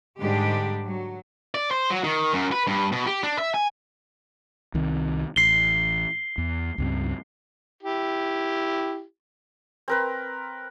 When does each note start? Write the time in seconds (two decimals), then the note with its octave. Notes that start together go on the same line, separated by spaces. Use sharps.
0.22 G#2 D3 G3 G#3 D4 G4
0.82 F#3
1.55 D5
1.71 C5
1.91 F#3
2.04 D#3
2.33 F#2
2.52 B4
2.67 G2
2.92 B2
3.07 G4
3.23 D4
3.38 E5
3.54 G#5
4.74 C2 D#3 C4
5.36 A1 C7 G7
6.38 E2
6.78 C#2 G2 C4
7.83 E4 G4
9.88 C4 A#4 B4